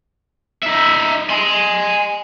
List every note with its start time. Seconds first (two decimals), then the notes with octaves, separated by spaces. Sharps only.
0.63 D#4 E5
1.30 G#5 C6